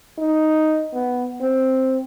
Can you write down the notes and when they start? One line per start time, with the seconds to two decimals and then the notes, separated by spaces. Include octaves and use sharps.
0.18 D#4
0.94 B3
1.42 C4